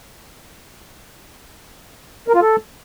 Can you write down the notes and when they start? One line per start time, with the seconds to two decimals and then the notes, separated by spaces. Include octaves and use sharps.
2.28 A#4
2.35 F4
2.41 A4